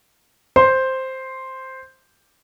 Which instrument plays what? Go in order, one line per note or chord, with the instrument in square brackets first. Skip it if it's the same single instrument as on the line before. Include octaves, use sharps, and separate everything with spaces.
[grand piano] C5 C6